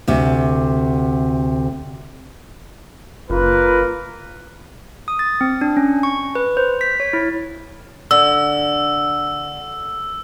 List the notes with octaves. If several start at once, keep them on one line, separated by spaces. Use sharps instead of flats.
D2 C3
F#1 A#3 F4 A#4 B4
D#6
A6
C4
D4
C#4
C#6
B4
C5
B6
C#5
E4
D3 E6